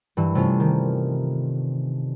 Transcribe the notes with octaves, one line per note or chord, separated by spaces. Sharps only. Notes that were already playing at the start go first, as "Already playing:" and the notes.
G2 E3
C3 A3 C#4 F4
D#3